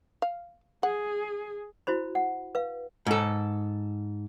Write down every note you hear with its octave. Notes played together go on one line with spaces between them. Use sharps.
F5
G#4 F#5
E4 F#4 C5 B5
F#5
B4 F5
G#2 A4